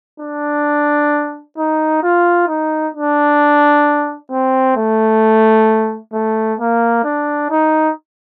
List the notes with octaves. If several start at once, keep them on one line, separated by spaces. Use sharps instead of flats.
D4
D#4
F4
D#4
D4
C4
A3
A3
A#3
D4
D#4